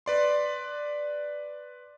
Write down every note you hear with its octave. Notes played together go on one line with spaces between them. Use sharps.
B4 D5 C6